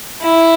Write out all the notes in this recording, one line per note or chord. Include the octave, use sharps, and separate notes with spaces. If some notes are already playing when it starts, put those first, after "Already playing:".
E4